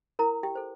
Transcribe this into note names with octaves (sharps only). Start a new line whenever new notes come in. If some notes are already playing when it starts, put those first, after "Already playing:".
E4 A#4 A#5
G4 G5
A4 C5